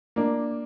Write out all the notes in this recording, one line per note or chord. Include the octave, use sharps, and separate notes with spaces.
A#3 D4